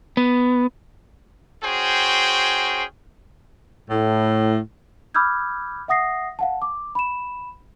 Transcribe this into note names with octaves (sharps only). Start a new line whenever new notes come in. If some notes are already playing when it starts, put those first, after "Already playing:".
B3
C#4 F#4 G#4 C5 G5
A2
B5 D6 E6 F6 G6 G#6
E5 F#5 D#6 A#6 C7
F5 F#5 A5
D6
B5 E7